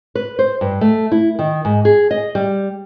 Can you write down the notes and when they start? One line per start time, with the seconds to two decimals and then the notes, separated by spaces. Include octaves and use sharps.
0.15 B4
0.39 C5
0.61 G2
0.81 A3
1.12 E4
1.39 D#3
1.65 G#2
1.85 G#4
2.11 D#5
2.35 G3